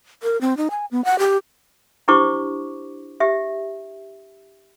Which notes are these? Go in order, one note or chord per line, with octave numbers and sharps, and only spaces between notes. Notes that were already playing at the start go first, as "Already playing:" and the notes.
A#4
C4
D#4
G#5
B3
F#5
G4
D4 E4 G4 C5 C#6 D6
G4 E5